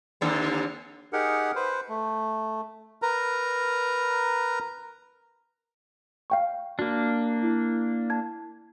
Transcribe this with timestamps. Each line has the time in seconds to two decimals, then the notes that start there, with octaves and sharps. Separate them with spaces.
0.21 D#2 D3 C4
1.13 D#4 G4 G#4 A#4 F#5
1.55 B4 C5
1.89 A3
3.02 A#4 B4 A#5
6.30 F5 G5 C#6
6.79 A#3 D4 F#4
7.43 E4
8.10 A5 G#6